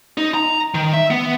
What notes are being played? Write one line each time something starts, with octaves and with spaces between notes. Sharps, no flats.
D#4
A#5
D#3
E5
B3